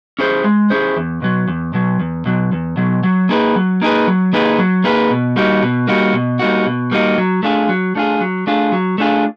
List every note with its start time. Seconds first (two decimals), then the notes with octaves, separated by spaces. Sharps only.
0.19 C#4 E4 G#4 C5
0.44 G#3
0.70 C#4 E4 G#4 C5
0.96 E2
1.22 B2 F#3
1.48 E2
1.74 B2 F#3
2.00 E2
2.26 B2 F#3
2.52 E2
2.77 B2 F#3
3.03 F#3
3.29 A#3 D#4 G#4 B4
3.56 F#3
3.82 A#3 D#4 G#4 B4
4.07 F#3
4.33 A#3 D#4 G#4 B4
4.58 F#3
4.84 A#3 D#4 G#4 B4
5.11 B2
5.36 G3 A#3 D#4 F#4
5.63 B2
5.87 G3 A#3 D#4 F#4
6.13 B2
6.39 G3 A#3 D#4 F#4
6.66 B2
6.91 G3 A#3 D#4 F#4
7.18 F#3
7.43 A3 D4 F4 G#4
7.69 F#3
7.95 A3 D4 F4 G#4
8.21 F#3
8.47 A3 D4 F4 G#4
8.72 F#3
8.98 A3 D4 F4 G#4